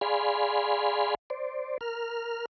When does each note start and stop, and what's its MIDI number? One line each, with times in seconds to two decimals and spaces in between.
0.01 1.15 68
0.01 1.15 74
0.01 1.15 77
0.01 1.15 80
0.01 1.15 83
0.01 1.15 84
1.30 1.78 72
1.30 1.78 74
1.81 2.46 70
1.81 2.46 89